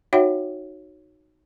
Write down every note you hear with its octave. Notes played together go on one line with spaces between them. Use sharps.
D#4 F#4 C#5 E5 F#5 G5